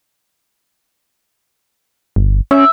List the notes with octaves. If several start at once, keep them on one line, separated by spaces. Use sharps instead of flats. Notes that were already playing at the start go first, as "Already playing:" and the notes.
G1
C#4 E5